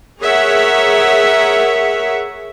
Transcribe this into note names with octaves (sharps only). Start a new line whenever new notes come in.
G#4 A#4 C#5 E5 F#5